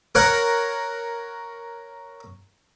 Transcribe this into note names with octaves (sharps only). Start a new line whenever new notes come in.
A#4 C#5 F#5